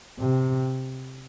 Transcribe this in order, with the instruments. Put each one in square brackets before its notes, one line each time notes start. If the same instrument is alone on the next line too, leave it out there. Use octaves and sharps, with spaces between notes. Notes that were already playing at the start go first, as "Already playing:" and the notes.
[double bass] C3